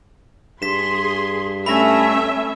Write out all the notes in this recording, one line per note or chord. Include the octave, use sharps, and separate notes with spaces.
G2 G#4 C6 B6 E7
A3 C#4 E5 B5 A#6